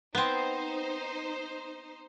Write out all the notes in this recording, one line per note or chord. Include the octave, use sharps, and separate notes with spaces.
B3 C4 D#4 C5